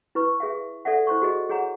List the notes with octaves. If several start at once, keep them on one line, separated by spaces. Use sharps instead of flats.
E4 B4 C#6
G#4 E5 F5
A4 D5 E5 F#5
E4 C5 C6 C#6
F#4 G#4 D#5
G#4 C#5 F#5 A#5